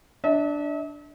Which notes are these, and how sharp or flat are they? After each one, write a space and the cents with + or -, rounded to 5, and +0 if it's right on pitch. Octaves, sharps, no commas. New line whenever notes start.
D4 +0 E5 -45